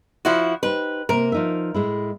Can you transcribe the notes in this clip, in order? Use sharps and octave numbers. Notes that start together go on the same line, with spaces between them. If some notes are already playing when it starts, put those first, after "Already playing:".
F3 E4 F#4
D#4 G4 B4 C5
C3 A#3 A#4
F3 D#4 E5
A2 G#3 E4